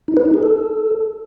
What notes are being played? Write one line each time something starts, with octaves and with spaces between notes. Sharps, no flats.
D#4
B4
D#4
G#4
A4